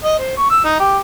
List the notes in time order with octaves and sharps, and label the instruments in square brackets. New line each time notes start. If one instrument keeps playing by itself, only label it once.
[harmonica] D#5
C5
C#6
E6
D#4
G4